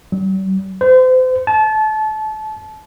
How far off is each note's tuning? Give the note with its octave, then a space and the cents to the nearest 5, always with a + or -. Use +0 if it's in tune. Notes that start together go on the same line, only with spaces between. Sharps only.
G3 -45
C5 -35
A5 -30